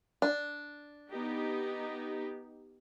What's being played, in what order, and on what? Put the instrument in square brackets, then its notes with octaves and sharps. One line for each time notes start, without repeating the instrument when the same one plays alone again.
[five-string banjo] D4
[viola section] B3 D#4 G4